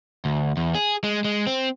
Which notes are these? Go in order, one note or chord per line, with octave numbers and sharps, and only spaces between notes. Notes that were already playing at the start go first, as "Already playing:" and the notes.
D2
E2
G#4
G#3
G#3
C4